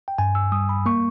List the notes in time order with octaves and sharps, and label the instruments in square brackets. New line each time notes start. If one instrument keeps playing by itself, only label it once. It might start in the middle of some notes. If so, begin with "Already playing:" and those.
[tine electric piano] G5
G2 G#5
E6
G3 D#6
B5
A#3 C#6